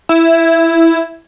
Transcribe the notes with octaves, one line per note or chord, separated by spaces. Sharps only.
E4